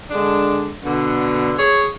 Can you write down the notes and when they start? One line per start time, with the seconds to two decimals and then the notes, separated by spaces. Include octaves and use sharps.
0.10 D3 G#3 D4
0.83 B2 D3
1.57 G#4 C#5